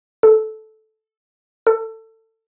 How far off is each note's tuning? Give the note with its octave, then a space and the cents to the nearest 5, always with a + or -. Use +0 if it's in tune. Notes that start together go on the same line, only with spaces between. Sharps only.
A4 -10
A4 +25